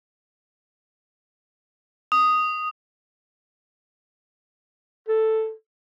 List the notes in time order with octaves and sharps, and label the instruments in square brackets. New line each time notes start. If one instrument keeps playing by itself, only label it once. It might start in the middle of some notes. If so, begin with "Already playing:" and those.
[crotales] D#6
[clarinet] A4